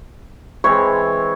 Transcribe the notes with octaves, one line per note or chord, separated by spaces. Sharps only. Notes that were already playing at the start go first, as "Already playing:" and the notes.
E3 G#3 C4 C#5